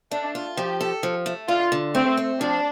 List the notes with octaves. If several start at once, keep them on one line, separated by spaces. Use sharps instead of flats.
A3 D4
F4
F3 G4
A4
F3
A3
D3 F4
D3
A3 C4
C4
F3 D4